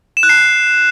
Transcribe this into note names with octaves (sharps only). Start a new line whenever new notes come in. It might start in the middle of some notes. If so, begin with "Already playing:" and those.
E7
F#6
C7